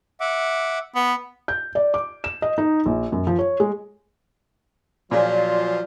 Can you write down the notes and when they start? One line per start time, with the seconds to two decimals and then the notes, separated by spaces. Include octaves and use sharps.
0.20 E5 F#5 D6
0.95 B3
1.48 G6
1.75 D5
1.94 D6
2.24 E7
2.42 D#5
2.58 D#4
2.86 A#1
3.12 F#2
3.27 F3
3.39 C#5
3.60 G#3
5.11 A#2 F3 F#3 F4 G#4 D5